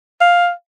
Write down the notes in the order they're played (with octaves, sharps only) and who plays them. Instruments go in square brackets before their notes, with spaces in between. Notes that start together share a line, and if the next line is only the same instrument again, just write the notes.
[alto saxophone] F5